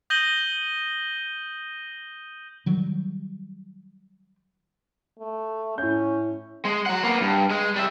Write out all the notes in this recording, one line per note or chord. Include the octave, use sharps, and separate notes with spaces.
D#6 G6 A#6 D#7 F#7 G7
D#3 F#3 G3
A3
A2 C#4 G6
G#3
F#3 F#5
A#3 B3
G2
G#3
G3 E5